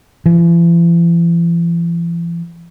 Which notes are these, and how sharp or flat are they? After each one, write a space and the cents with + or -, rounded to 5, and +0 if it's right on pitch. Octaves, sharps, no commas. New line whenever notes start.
E3 +45